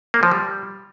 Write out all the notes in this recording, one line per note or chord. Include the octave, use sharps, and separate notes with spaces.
A#3
F3
G3